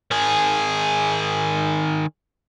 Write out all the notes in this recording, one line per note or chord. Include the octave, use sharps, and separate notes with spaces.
D#3 G#4